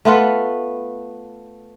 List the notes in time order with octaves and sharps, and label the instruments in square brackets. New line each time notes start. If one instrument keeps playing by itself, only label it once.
[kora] A3 B3 F4 B4